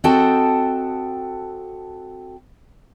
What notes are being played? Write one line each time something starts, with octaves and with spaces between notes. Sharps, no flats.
C4 F#4 A4 D#5 G5 A5